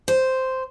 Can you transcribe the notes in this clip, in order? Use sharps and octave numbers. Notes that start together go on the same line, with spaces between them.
C5